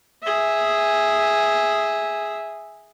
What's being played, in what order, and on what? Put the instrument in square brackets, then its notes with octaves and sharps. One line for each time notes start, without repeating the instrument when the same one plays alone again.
[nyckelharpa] G#4 E5